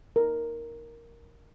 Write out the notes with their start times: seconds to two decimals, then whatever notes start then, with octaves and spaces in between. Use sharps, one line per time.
0.16 A#4